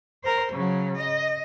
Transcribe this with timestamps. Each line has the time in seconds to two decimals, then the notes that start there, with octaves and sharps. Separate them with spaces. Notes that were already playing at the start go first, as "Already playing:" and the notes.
0.24 A#4 C5
0.53 C#3 F#3
0.97 D#5